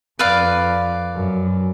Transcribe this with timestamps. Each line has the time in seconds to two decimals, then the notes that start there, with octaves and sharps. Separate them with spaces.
0.19 F2 B4 D5 F5
1.14 F#2